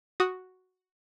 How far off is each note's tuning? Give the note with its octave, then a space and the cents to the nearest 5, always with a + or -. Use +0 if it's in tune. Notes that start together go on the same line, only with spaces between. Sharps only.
F#4 +0 D#6 +0